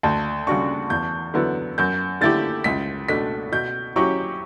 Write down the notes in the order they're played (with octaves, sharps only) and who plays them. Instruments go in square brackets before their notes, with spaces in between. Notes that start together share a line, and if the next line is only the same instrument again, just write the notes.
[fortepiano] D2 [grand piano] A5
[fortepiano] C#3 G3 D4 F#4 [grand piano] C#6
[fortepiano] E2 [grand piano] G6
[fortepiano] D3 F#3 B3 E4
[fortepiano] F#2 [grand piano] G6
[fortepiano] D3 A3 E4 G4 [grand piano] A6
[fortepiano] C#2 [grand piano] B6
[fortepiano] B2 A3 D4 [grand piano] B6
[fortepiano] B2 [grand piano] G6
[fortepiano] F#3 C#4 E4 G4 [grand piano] C#6